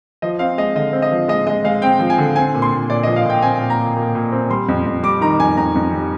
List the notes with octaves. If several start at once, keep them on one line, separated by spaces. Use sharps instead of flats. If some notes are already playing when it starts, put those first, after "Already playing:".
F3 D#5
C4 F5
G#3 D#5
D3 D#5
C4
D#5
F3
G#3 D#5
G#3 D#5
G#3 F5
C4 G5
F3
G#5
D3
C4 G#5
A#2
C6
A#2
A#2 D5
D#5
F3
F5
A#2 G5
C4 G#5
A#2
A#5
A#2
A#2
A#2
C4
G3 C6
F2
F2
G3 D6
D#3 A#5
F2 G#5
F2 A#5
F2
G3